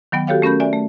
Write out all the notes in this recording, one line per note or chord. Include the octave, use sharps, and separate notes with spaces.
D#3 F#3 B3 G5
F#4 G4 A4 C#5 F5 G5
A3 C#4 A#4 B5 G6
D5 E5 G#5
A3